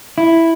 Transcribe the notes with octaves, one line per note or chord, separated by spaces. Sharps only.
E4